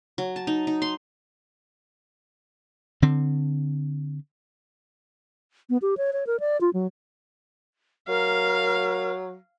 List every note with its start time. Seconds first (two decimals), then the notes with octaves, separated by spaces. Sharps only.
0.18 F#3
0.36 A5
0.47 D#4
0.67 D#4
0.82 C6
3.02 D3 C4
5.70 B3
5.82 G4
5.97 C#5
6.13 C#5
6.27 A#4
6.40 D5
6.61 F4
6.73 F#3
8.08 F#3 A#4 F5